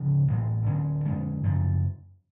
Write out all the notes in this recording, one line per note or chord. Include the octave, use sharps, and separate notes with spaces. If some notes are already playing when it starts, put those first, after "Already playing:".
Already playing: D2 C#3 F3
A1 A2 F#3
D2 D3 F#3 C#4
F2 D3 G#3 C#4
F#2 C#3 F3